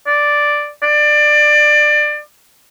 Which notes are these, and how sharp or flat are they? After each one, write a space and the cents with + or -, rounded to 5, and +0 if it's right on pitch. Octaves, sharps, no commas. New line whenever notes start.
D5 +0
D5 +20